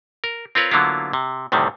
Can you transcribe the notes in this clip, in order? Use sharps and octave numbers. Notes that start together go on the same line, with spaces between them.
A#4
C4 F4 A#4 B4 C#5
D3 F#3 A#3 B3 E4 F4
C3
D2 A2 C3 D#3 G3